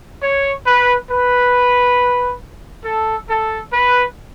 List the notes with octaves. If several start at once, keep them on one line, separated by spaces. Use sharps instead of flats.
C#5
B4
B4
A4
A4
B4